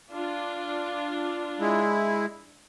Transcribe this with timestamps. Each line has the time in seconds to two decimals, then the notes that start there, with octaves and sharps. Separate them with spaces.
0.12 D4 F4
1.60 G#3 E4